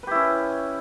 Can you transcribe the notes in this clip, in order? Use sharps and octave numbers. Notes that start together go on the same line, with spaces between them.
C#4 E4 G4 B4